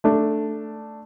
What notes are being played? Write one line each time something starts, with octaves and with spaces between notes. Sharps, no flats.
A3 D4